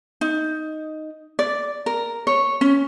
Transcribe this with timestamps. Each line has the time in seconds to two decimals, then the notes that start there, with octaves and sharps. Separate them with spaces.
0.21 D#4
1.39 D5
1.86 A#4
2.27 C#5
2.61 C#4